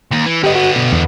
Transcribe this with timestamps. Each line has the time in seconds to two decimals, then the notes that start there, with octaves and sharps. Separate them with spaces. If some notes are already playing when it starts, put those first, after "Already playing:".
0.11 D#2
0.26 E3
0.44 D3 B3 G4 D#5
0.55 F#4
0.76 B2
0.93 E2